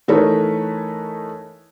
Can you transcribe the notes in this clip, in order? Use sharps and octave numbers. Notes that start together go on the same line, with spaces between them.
E3 A3 D#4 A#4 B4 C#5